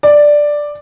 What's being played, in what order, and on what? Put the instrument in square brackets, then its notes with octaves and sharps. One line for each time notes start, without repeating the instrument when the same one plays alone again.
[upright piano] D5